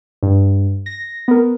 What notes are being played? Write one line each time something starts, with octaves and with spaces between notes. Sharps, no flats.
G2
A#6
B3 A#4